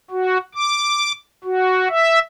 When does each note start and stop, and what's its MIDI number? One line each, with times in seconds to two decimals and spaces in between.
0.11 0.38 66
0.54 1.12 86
1.44 1.88 66
1.90 2.19 76